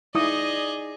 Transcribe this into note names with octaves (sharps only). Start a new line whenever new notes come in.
D#4 E4 G#4 D5 D#5 D#6